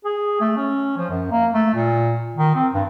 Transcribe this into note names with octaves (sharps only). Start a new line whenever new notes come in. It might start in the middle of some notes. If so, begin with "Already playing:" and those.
G#4
A3
C#4
F3
F#2
A#3
A3
A#2
D#3
C4
G2